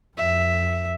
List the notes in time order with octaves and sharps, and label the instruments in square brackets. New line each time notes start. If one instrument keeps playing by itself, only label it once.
[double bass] F2 [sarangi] E5